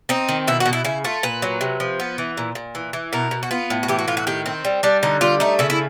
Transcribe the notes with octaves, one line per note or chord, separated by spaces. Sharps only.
C4 D#4
D#3
B2 E4
F#4
B2
E4
C#3 E4
A3 F4
A#2 B4
F#3
C3
F3
B3
E3
A#2
A#2
E3
E3
B2 A#4
B2
F#4
B3 F4
A2
F#4
E3 G4
F#4
A2 F4
F#4
D#3 G4
C4
G3
G3 D4
D3 D#4
G3 F4
A3 D#4
C#3 E4
E4